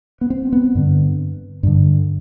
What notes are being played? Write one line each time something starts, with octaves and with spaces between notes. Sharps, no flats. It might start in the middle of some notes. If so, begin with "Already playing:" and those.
B3
C4
B3
G2 D3
G2 D3